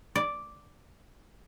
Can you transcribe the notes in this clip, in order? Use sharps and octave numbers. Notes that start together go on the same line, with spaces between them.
D5